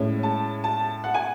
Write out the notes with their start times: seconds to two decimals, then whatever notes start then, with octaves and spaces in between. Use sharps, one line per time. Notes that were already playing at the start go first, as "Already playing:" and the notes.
Already playing: A2 G#3 C#4
0.23 A5
0.64 A5
1.04 F#5
1.14 G#5